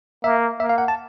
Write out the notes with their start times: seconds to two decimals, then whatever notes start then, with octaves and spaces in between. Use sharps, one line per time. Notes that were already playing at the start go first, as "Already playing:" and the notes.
0.24 A#3 E5
0.60 A#3 E5
0.69 F5
0.78 F#5
0.88 A5